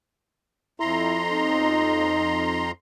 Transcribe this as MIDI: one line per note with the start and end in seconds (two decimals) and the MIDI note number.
0.80 2.71 41
0.80 1.22 64
0.80 2.71 82
0.80 2.71 84
1.33 2.65 63